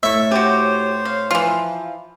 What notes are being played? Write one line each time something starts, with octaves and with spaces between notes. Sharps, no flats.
A2 E4 E5 C#6
F#4 G4 C5 C#5
F5
E3 F3 F4